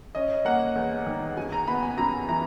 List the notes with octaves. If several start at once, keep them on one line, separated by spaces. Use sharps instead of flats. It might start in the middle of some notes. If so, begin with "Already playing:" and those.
C#4 D#5
A#3 F#5
E2
D#3
F#2 G#5
A#5
B3 B5
G#5
F#2 A#5
E3 A#5